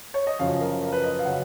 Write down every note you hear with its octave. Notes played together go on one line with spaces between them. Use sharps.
C#5
D#5
F#2 C#3 F3 F5
A#4
A#4
B4
D#5
F5
C#3 F#3 F#5